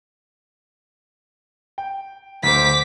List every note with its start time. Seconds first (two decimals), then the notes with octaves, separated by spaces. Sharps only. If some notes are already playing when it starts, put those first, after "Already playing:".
1.78 G5
2.43 D2 C5 D6 B6